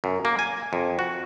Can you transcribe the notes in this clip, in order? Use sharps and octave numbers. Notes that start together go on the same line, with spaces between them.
F#2
A#3
G#5
F2
F#4